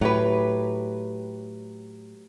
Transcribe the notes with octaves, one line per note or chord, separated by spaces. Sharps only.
A2 F#3 G4 B4